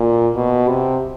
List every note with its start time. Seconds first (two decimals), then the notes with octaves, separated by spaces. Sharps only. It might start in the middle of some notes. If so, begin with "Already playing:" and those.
Already playing: A#2
0.36 B2
0.69 C3